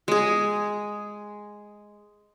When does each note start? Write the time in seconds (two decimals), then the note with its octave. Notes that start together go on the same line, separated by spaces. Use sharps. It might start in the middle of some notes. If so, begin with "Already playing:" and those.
0.08 G#3 G#4